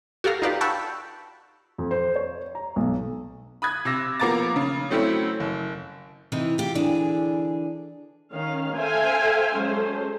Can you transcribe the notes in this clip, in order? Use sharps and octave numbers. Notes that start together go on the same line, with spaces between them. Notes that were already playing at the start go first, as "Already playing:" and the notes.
F#4 G4 A4 F5 A#5
D#4 F4 G4 B4 D5 F5
F#5 G5 A5 B5 C#6 E6
F2
C5
C#5
A#5
B1
B5 D#6 F#6 G#6
C3 D6 E6 A#6
F3 A#3 B3 A#5 D6 A6
C#3
F#3 A3 C4 C#4 E4
F#1
C3 E3 D#4 E4
F4 G4
D3 E3 D4 G#4
D#3 C#4 F5
A4 C5 E5 F5 G5 G#5
F#3 G#3 C#4 A4 C5